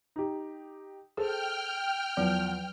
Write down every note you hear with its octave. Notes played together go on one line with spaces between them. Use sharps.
D#4 G4
G#4 A4 C5 G5 F6
E2 F3 F#3